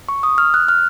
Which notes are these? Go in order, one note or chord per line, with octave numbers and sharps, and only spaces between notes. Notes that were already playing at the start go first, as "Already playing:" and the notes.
C#6
D#6
F6
F#6
F6